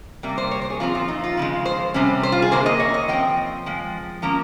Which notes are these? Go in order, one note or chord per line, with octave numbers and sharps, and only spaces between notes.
C3 G3 A#3
C5
C#5
C5
G#4
A#2 F3 C4 F4
F4
D#4
F4
C#3 F3 G#3
C5
C3 G3 C#4
C5
F4
G#4
C3 D#3 A#3 C5
D#5
C#5
D#5
F3 C4 G5
F3 G#3
F3 A#3 C#4 A#5